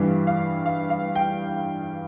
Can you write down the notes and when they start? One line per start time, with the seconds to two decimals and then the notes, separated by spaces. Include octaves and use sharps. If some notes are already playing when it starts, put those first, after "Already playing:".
Already playing: G2 E3 G3 F5
0.27 F5
0.66 F5
0.90 F5
1.15 G5